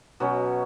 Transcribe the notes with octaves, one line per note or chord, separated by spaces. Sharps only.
B2 F#3 C#4